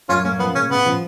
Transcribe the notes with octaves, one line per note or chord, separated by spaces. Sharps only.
F#2 C#4 F4
A#3 C#4
F3 B3
C#3 C#4
C#3 B3
F3